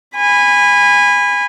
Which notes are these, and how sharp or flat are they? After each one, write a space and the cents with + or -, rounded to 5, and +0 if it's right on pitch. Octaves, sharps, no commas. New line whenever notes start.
G#5 -20 B5 +0